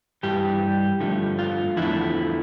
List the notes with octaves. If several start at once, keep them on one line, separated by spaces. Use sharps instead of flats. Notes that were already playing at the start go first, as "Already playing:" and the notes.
G2 E3 G3 G4
G2 D3 F3 A3
F4
E2 D3 F3 A3 E4